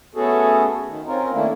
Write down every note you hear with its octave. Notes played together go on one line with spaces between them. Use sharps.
A3 B3 C#4 F#4 G#4 A4
D#3
C4 C#4 F4 A#4
D#3 A3 A#3 C#4 D4 E4